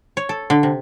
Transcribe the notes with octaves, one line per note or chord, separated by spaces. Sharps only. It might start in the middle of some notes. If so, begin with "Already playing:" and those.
C#5
A4
D3
C3